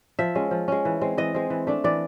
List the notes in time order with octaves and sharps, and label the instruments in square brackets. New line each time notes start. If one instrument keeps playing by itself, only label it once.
[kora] F3 E5
G#3 C#4
F3
G#3 C#4
E3
G#3 C4
E3 D#5
G#3 C4
E3
A3 D4
E3 D5